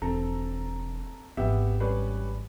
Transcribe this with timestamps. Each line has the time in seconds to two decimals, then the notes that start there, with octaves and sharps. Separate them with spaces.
0.02 E1 C4 A4 A#5
1.37 G#1 E3 B3 G4 E5
1.80 G3 C#4 B4